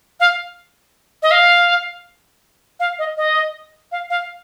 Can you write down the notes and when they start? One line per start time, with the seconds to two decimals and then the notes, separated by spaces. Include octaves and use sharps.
0.20 F5
1.23 D#5
1.31 F5
2.80 F5
2.99 D#5
3.17 D#5
3.92 F5
4.10 F5